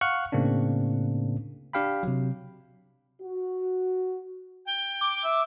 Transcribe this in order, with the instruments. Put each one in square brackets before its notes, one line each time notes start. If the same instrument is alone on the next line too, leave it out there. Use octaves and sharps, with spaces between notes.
[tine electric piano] F5 F#5 C#6 F6 F#6
A2 C#3 A#3 C4 D4
D4 G4 F5 G5 B5
C3 F#3
[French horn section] F#4
[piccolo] G5
[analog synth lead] D6
[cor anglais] E5